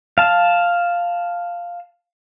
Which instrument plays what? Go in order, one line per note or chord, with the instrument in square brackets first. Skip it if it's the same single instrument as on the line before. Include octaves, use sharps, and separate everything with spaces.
[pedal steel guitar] F5 A5